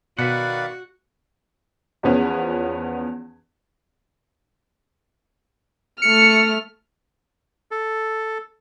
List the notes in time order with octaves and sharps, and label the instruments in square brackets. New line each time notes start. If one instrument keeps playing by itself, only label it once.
[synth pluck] B2 [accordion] D#3 D5 F5 [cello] F#4 [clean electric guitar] B4 F#5
[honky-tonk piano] E2 F3 B3 C#4
[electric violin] A3 F6 [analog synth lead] C#7
[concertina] A4